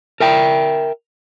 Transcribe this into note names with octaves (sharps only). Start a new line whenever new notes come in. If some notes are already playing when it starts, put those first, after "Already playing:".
A#4 E5 G5